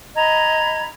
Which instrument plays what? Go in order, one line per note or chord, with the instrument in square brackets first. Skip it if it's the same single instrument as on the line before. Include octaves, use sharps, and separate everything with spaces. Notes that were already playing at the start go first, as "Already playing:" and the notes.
[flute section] D#5 A#5 B5 G#6